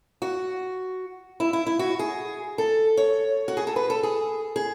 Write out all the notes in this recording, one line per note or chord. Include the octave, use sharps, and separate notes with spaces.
F#4
E4
E4
E4
F#4
G#4
A4
C#5
F#4
G#4
A4
B4
A4
G#4
G#4